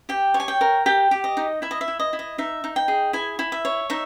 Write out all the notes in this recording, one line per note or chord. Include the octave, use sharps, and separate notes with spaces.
G4 G5
C#5
G#5
G5
A#4
G4 G5
G4
D#5
D#4
E4 E5
D#5
E5
E4
D#5
E4
D#5
D#4 E5
D#4
G5
G#4
E4 G#5
E4
E5
C#5
D#4 E5